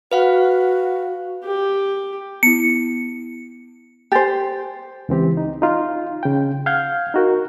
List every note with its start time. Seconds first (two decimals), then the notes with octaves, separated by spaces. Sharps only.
0.12 F#4 B4 F5 F#5
1.44 G4
2.43 B3 E4 C#7
4.12 G4 C5 G5 G#5 A6
5.09 C#2 E3 C4 G4
5.37 D#4
5.62 D#4 F4
6.23 C#3 G5
6.66 F5 F#5 F6 G6 G#6
7.14 D#4 F#4 A#4